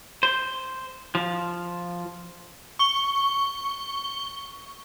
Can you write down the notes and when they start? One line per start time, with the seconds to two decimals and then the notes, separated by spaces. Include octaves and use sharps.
0.23 C5
1.15 F3
2.79 C#6 G7